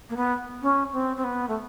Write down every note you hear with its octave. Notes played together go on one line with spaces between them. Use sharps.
A#3
B3
C#4
C4
C4
B3
A3